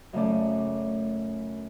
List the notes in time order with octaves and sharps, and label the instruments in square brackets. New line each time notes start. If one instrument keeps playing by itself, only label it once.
[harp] F#2 C#3 A3 C#4 D5